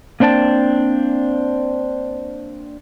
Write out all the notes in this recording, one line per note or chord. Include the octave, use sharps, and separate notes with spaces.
A#3 C4 D4 G5 A5